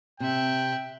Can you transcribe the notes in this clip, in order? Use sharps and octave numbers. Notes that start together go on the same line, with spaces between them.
C3 E5 G5 F#6